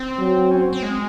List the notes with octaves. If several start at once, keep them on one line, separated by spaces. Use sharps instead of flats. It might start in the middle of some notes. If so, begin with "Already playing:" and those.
Already playing: C4
F#3
C#4
C4
C4
G#3